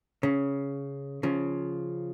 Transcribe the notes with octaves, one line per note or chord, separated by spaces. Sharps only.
C#3
C#3 F3